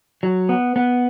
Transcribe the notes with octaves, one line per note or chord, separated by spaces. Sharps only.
F#3
B3
B3